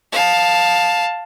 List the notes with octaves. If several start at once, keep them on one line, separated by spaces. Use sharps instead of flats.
F5 A5